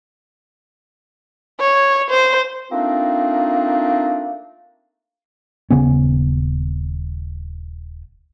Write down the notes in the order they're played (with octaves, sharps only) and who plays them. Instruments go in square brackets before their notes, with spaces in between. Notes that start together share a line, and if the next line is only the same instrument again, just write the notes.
[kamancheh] C#5
C5
[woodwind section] A3 A#3 C4 D4 D#4 F4
[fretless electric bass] D#1 C#3 B3 C#4